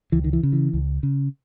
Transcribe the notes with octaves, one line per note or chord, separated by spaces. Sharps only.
C#2 E3
D#3
E3
C#3
E3
C#2
C#3